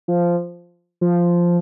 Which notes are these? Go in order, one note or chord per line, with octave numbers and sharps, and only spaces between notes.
F3
F3